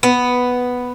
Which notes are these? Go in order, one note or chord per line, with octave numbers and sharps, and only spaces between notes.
B3